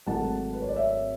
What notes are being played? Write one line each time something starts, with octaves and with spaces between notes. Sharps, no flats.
G#1 G#2 F#3 A3 F#5 A5
B4
C#5
D5
C#5 E5